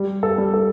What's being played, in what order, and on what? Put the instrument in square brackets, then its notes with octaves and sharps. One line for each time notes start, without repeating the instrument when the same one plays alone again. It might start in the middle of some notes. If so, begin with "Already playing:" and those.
Already playing: [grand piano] G3
A4
G3
A4